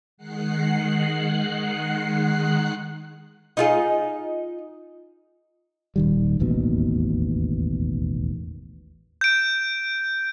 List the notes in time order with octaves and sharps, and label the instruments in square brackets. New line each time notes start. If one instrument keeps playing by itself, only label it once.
[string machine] D#3 G#3 F#5 F#6 C7
[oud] D#4 F4 G#4
[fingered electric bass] D#1 D#3 G3
E1 A1 D#2 B2
[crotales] G6 D7